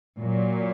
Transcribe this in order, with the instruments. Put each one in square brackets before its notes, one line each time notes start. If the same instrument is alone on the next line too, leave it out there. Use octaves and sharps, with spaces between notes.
[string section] A#2 F#3